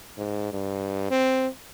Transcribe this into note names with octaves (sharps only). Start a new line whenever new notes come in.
G#2
G2
C4